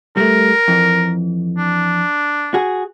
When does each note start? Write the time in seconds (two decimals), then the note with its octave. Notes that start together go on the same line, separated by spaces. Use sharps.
0.17 G3 A3 A#4
0.68 F2 E3
1.58 D4
2.54 F#4 G#4